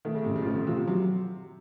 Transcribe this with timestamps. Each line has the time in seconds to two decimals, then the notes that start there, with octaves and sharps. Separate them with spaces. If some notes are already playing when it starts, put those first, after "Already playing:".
0.05 D#3 A3
0.14 C#3
0.25 A1 C3
0.36 C#3
0.42 F3
0.46 D#3 A3
0.56 C3
0.67 C3 F3
0.77 C3
0.87 C3 F#3